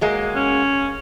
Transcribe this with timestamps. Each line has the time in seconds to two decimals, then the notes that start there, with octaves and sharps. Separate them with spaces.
0.01 F#3 G#3 A#3
0.36 C#4